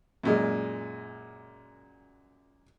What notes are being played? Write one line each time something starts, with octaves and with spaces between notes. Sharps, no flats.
F#2 A#2 G#3